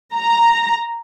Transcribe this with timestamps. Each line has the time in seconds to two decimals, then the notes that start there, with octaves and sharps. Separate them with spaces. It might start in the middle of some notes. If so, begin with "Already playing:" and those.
0.14 A#5